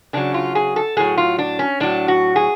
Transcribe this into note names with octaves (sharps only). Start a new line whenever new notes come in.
C#3 F#3 D4
F4
G#4
A4
A2 F#3 G#4
F4
D4
C#4
A2 F#3 D4
F#4
G#4